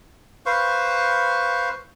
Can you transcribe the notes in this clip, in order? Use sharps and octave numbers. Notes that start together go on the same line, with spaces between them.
B4 C5 F5 C#6